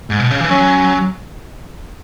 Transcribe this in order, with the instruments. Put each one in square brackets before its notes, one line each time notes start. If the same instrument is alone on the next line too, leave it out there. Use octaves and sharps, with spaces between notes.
[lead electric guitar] G#2
B2
C#3
E3
[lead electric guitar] F#3 [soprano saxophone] C#4